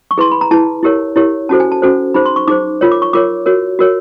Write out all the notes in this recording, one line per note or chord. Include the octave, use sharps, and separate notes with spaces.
C#6
E4 G#4 B4 C6
B5
A#5
E4 G#4 B4 A5
E4 G4 A#4 C#5
E4 G4 A#4 C#5
C#4 F#4 A4 C5 A5
G#5
A5
C#4 F#4 A4 C5
D#4 G#4 C5 B5
C6
C#6
D#4 G#4 C5 D6
F4 A#4 C#5
D6
C#6
F4 A#4 C#5 D6
F#4 A#4 C#5
F#4 A#4 C#5